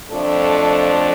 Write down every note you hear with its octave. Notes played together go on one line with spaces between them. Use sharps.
F2 F3 A3 D4 A4